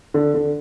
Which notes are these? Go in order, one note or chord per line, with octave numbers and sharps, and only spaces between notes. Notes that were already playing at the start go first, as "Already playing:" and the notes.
D3
D3